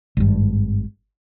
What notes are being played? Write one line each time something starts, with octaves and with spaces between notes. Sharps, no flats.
G#1 G2